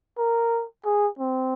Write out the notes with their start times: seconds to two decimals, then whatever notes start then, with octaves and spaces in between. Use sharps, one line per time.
0.18 A#4
0.85 G#4
1.19 C4